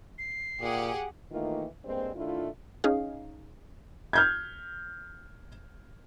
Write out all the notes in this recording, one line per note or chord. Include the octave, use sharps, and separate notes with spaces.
C7
A#2 G4 G#4 F#5
D#3 E3 A3 A#3 D#4 F4
G2 G#3 A#3 C4
D#3 A3 D4 E4 F4
C#4 D#4 G#4 F5
F6 G6 G#6